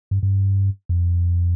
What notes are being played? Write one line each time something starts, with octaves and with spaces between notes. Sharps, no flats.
G2
G2
F2